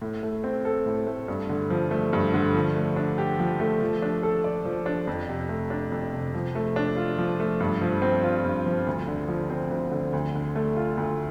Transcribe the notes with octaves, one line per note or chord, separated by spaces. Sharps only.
A2
A3
C4
A4
A2
A3
G2
D3
F3
A3
G2
D3
F3
A3
D4
G4
F3
A3
F3
D4
A4
D5
F3
D4
F2
C3
A3
D4
F2
C3
F3
A3
D4
F4
F3
A3
G2
F3
C4
F4
G2
F3
D2
D3
F3
C4
D2
D3
D2
D3
A3
F4
D2